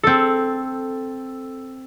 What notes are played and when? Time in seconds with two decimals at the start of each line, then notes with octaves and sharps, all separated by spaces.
0.03 C4 A4